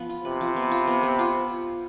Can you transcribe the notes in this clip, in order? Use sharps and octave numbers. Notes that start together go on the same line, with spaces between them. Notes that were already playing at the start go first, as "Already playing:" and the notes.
Already playing: F3 B3
F4
C3 B4
F3
B3
F4
B3
B3
F4